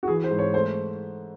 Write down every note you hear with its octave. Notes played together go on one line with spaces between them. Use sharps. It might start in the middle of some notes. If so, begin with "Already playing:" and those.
F#4
E3 G#4
C5
G#2
C#5
A3 C5